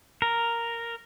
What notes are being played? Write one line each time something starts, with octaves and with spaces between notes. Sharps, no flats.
A#4